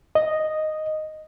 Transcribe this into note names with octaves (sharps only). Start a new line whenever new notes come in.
D#5